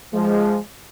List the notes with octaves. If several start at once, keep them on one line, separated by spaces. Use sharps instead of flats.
F3 G#3